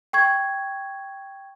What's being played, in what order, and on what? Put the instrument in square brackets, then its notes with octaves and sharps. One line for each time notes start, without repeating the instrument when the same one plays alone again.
[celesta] G5 C#6 G#6